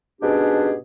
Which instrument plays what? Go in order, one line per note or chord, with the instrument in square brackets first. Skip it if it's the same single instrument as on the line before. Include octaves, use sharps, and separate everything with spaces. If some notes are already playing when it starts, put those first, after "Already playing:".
[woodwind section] G#2 B2 C#4 D4 G4 G#4